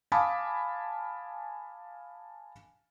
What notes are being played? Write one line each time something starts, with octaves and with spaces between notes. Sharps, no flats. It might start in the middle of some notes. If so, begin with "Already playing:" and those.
F5 G#5 A5 B5 D6 D#6